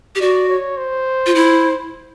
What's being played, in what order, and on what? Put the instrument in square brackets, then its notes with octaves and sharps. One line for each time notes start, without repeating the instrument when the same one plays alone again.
[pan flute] G4
[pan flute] F#4 [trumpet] D5
[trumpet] C#5
C5
[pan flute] F4
E4